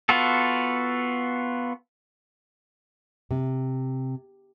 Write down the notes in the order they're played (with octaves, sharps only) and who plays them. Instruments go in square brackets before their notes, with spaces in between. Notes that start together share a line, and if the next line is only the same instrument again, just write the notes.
[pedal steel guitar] B3 F4 F#4 A4
[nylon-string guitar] C3